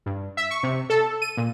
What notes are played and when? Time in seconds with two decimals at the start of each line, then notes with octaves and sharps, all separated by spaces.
0.06 G2
0.37 E5
0.51 C#6
0.63 C3
0.90 A4
1.22 D#7
1.37 A#2